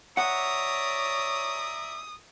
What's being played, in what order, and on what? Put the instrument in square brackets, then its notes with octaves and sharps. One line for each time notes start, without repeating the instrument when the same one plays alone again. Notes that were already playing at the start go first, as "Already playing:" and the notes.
[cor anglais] C#5 [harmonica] D5 E5 A#5 [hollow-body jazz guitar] F#5 [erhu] D#6